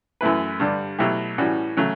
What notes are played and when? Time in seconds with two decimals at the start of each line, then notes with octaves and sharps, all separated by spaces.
0.21 F#2 E3 A3 E4 B4
0.60 G2 D3 G3
0.99 B2 F#3 A3 E4 G4
1.38 A2 E3 G3 C#4 F#4
1.77 C#3 F#3 A3 C#4